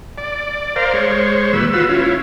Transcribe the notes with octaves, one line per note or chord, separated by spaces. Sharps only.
D5
A#4 C5 D5 F5
G#3 C5 C#5
D#2 A#2 G3 B4 E6
F4 F#4 B4 E6
C#4 E4 F4